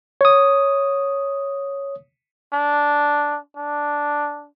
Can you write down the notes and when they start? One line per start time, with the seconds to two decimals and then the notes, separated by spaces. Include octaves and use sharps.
0.21 C#5 D#6
2.53 D4
3.57 D4